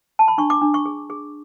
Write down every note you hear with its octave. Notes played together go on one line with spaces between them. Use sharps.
A5
B5
D4 C#6
D6
D4
C#6
G#4
G#4